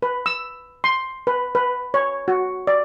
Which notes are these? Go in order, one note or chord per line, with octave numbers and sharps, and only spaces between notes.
B4
E6
C6
B4
B4
C#5
F#4
D5